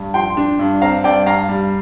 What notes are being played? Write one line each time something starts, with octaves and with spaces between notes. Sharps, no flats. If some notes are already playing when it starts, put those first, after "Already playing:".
Already playing: G2
F3 G5 C6
D4
G2
C4 F5 A#5
G2 D5 G5
G2 F5 A#5
G3